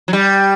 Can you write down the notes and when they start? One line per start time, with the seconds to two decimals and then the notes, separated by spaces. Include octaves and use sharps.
0.08 F#3
0.13 G3